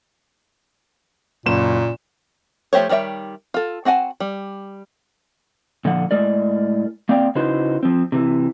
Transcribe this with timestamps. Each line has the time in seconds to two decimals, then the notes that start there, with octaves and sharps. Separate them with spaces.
1.46 F#1 A#2 E7
2.73 F3 A3 G4 C5 C#5
2.89 D#3 G3 C#5 E5 G5
3.54 F4 A4
3.85 C4 F#4 F#5 G#5 A5
4.20 G3
5.85 A#2 D3 F3 F#5
6.11 A2 G#3 A#4 D5
7.09 A#3 C4 D5 F5 G5
7.35 C#3 D#4 E4 F#4 B4 C5
7.83 F3 C4
8.12 C3 E3